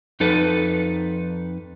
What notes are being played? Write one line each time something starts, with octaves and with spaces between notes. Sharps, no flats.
F2 D#4 A4 B4